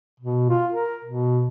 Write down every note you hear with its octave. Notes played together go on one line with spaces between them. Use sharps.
B2
F4
A#4
B2